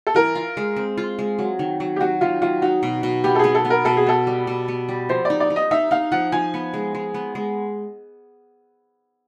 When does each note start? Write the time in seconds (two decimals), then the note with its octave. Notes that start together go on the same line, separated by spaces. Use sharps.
0.07 A4
0.14 E3 A#4
0.35 F4
0.57 G#3
0.76 C4
0.97 F4
1.19 G#3
1.39 F#3
1.59 D#3
1.80 F#3
1.96 G4
2.00 F#3 F#4
2.21 D#3 F4
2.42 F#3 F4
2.62 D#4 F#4
2.83 B2
3.03 B2
3.24 B3 G4
3.35 A4
3.39 B3 G#4
3.55 A4
3.65 B3
3.70 A#4
3.85 B2 A4
3.97 G#4
4.06 B3 A4
4.27 G3
4.47 B2
4.68 B3
4.89 G3
5.09 F3 C5
5.25 D#4 D5
5.40 D5
5.50 D#4
5.56 D#5
5.71 D#4 E5
5.91 D#4 F5
6.12 F3 F#5
6.32 F3 G#5
6.54 B3
6.74 G#3
6.95 G#3
7.14 B3
7.35 G#3